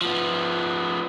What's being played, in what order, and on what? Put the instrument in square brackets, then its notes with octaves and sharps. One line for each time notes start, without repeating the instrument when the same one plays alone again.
[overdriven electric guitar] F3 B3